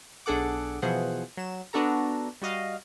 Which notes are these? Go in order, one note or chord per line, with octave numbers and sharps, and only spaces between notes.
B1 D4 G#4 A4 F#5 D6
B2 E3 F3 G#4 C5 F#5
F#3 E7
B3 D4 F#4 A4 A#5
G3 F#4 D#5 F5